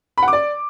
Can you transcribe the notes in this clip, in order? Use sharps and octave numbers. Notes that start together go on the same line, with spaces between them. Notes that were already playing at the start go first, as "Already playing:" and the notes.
B5
F#5
D6
D5